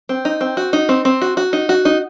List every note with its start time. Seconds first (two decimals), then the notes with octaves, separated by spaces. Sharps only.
0.09 C4
0.25 D#4
0.41 C4
0.57 F#4
0.73 D#4
0.89 C4
1.05 C4
1.22 F#4
1.37 F#4
1.53 D#4
1.69 F#4
1.85 D#4